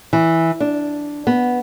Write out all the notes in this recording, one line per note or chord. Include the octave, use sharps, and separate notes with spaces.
E3
D4
B3